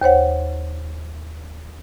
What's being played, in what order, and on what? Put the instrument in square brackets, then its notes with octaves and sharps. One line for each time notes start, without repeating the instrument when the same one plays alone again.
[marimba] D#2 C5 C#5 F#5